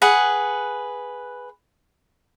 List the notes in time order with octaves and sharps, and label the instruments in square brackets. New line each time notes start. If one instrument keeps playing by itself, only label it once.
[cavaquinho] G#4 B4 F#5